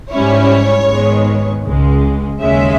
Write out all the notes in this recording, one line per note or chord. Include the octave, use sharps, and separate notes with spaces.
G#2 G3 C#4 E4 C#5
G#2 D#3 G#3 B3
C#2 C#3 G#3
D#2 C#3 G#3 C#4 E5